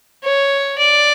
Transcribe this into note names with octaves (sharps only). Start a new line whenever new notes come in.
C#5
D5